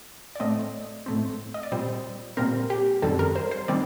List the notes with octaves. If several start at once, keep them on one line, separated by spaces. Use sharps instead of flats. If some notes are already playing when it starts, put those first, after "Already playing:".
D5
A2 A3 C4 D#5
A2 A3 C4
D#5
D5
A#2 G3 C4 C5
A#2 G3 C4 A#4
G4
F#2 D#3 G3 C4 A4
A#4
C5
C5
D#3 G3 C4 D5